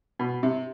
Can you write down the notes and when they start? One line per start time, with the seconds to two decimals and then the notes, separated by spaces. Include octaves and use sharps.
0.19 B2
0.43 C3